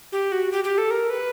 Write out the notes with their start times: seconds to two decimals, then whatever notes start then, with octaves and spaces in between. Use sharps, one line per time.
0.12 G4
0.32 F#4
0.52 G4
0.64 G4
0.78 A4
0.91 A#4
1.10 B4